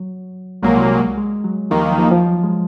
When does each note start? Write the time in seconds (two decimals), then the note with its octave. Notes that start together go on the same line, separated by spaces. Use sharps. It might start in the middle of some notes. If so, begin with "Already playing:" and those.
Already playing: F#3
0.63 C2 A#2 F#3 G#3 A#3
1.17 G#3
1.44 F#3
1.70 D#2 D#3 F3 A#3 D#4
1.85 F#3
1.98 F3
2.11 F3
2.25 F#3
2.44 G#3